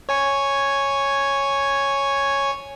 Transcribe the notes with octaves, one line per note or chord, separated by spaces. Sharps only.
C#5 G#5 C#6